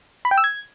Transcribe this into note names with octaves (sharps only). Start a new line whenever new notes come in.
B5
G5
E6
G#6